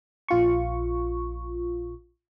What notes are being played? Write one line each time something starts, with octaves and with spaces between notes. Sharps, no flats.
A#1 F4 C#6